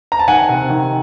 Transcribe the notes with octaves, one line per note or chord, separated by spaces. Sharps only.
A#5
A5
D#3 F#5 G#5
C3
D#3